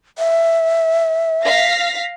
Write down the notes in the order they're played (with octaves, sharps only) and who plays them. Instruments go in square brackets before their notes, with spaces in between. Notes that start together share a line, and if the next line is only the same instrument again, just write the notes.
[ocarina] E5
[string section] F5 A#6 B6